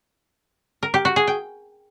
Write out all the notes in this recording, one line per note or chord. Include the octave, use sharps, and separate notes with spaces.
A#4
G4
F#4
G#4
G5